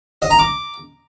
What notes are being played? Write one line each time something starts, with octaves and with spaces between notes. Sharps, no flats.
D#5
A#5
D6